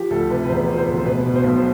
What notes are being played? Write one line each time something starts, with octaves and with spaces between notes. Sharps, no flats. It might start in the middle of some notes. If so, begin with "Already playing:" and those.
Already playing: F3 G4
D2 A4
C3 B4
B4
E1 C5
F3
C5
D2
B2 B4
B2
C5
B1